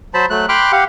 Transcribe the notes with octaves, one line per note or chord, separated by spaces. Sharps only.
F#3 C5 A5 B5
F#3 A3 F#6
G5 B5 C6 D6 F6 F#6
G4 F5 F#5